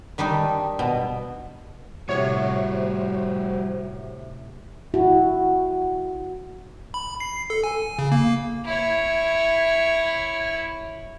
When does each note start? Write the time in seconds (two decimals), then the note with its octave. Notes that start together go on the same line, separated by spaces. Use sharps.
0.18 D#3 G3 D4 D#4
0.79 B2
2.09 A2 C3 G3 F#4 C5 C#5
4.94 E4 F#4
6.94 B5
7.20 C7
7.50 A4
7.64 G#5
7.99 C#3
8.12 A#3
8.65 E4 C#5